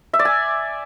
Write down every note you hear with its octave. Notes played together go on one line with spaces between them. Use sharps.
E5
D5
G#5